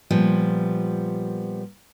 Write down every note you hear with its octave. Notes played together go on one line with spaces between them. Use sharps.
A#2 F3 G3 B3